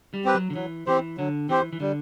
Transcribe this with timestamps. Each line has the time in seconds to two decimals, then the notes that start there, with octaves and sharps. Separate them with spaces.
0.14 G3
0.25 C4 G4 B4
0.34 F#3
0.50 D3
0.55 E3 F#3
0.86 E3 C4 G4 C5
1.18 D3 F#3
1.49 E3 C4 G4 C5
1.73 E3
1.80 D3 G3